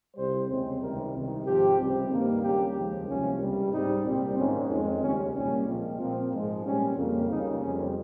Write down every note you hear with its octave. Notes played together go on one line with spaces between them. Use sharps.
C2 C3 G3 C5
D#2 C#3 G#3 C4
C#2 C3 D#3 G3 A#4
C2 C3 D#3
G#2 F3 C4 G4
C#2 C3 G3 C4
G2 D#3 G3 A#3
C#2 C#3 G3 A#3 G4
D#2 C#3 F3 G#3
C2 C3 F3 A#3 C#4
C#2 C3 G3
G#2 G3 C4 D#4
C2 A#2 G3 C4
G#2 D#3 A#3 C#4
F2 D#3 G#3 C4 C#4
D#2 C#3 G3 C#4
C2 A#2 G3 A#3 C#4
A#2 F3 G#3 C4
A#2 F3 A#3 C4
G#2 F3 G#3
A#2 G3 C4 C#4
F2 C#3 G3 A#3
C#2 C#3 G3 A#3 D#4
F2 C#3 G3 C4 C#4